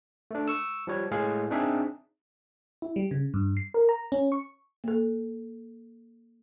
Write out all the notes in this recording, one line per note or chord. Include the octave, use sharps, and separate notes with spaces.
A3 D4
C#6 E6
F3 G3 C#5
A2 G#3 G#4 F5
C4 D4 D#4 G#4 E5
E4
G3
C#3
G2
C7
A#4
A#5
C#4
C#6
A#3 A4